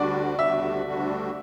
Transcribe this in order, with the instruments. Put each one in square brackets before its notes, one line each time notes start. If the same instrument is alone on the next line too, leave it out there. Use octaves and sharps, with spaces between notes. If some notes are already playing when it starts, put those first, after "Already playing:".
Already playing: [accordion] D2 D3 G3 D4 F#4 [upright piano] D5
[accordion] D2 D3 G3 D4 F#4 [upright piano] E5
[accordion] D2 D3 G3 D4 F#4